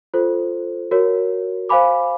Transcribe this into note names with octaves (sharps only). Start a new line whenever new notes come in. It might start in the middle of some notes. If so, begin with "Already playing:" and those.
F4 A4 C5
F#4 A#4 C#5
C5 F5 G#5 B5 D6